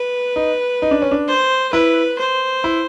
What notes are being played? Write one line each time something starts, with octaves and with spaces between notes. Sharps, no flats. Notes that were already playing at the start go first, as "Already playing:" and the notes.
Already playing: B4
D#4
D#4
D4
C#4
D4
C5
E4 B4
C5
E4